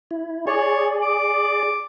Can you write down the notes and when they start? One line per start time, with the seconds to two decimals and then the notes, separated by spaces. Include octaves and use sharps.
0.11 E4
0.47 G#4 C#5 D5
1.02 D6